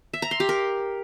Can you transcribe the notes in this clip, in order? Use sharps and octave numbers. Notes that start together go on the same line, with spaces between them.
E5
A#5
C6
G4
A#4